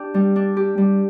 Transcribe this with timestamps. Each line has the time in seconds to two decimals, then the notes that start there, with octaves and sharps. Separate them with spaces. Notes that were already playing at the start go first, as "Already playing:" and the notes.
Already playing: D4 G4
0.14 G3
0.36 D4
0.57 G4
0.78 G3